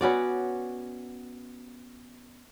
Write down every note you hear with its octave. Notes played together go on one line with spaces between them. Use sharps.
B3 C#4 F#4 D5